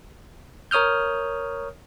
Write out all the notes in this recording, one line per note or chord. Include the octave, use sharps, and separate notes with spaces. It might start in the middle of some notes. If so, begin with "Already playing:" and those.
A#4 C#5 D#6 F6 G6